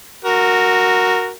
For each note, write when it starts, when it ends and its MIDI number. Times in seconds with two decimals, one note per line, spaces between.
0.24 1.31 66
0.24 1.31 70